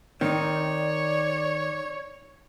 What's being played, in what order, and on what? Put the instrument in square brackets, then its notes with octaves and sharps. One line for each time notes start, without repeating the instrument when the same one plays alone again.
[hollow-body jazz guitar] D#3 [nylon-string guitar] C4 D#4 [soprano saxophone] C#5 [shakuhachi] D5